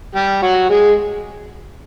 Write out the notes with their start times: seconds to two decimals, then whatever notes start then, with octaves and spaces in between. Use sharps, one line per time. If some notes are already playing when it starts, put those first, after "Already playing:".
0.15 G3 G4
0.42 F#3 F#4
0.69 G#3 G#4